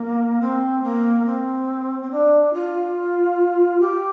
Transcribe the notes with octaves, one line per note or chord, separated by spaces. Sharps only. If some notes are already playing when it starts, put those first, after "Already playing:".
Already playing: A#3
C4
A#3
C4
C4
D4
F4
G4